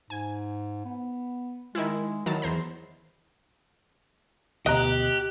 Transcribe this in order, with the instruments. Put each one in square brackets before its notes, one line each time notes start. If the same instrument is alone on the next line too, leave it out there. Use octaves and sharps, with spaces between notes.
[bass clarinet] G#2 [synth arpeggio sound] G#5
[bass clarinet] B3
[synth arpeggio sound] D#3 E4 [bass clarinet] G#3
[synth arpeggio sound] D#3 F#3 A5 [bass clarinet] E4
[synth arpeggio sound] E2 C5 A#5
[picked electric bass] D2 B2 [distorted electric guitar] G4 [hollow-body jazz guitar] D#5 A#5 [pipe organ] F#6